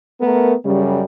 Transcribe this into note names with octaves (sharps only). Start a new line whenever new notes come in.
A3 B3 A#4
F#2 C#3 G3